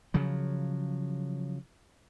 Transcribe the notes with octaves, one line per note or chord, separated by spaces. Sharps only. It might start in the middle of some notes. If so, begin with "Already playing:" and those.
C#3 F3 F#3